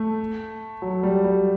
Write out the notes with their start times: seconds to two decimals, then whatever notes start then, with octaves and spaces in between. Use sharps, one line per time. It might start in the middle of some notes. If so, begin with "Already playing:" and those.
Already playing: A3
0.82 F#3
1.03 G3
1.24 G3